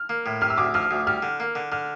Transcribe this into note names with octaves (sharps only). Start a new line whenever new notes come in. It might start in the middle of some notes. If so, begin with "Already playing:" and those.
Already playing: F6
A#3
A2
C3 F6
E6
D2 D6
F3 F6
D2
G3 F6
D3
A#3
D3
D3 F6